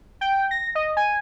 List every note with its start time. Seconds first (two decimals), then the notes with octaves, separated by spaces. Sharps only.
0.21 G5
0.51 A#6
0.75 D#5
0.97 G#5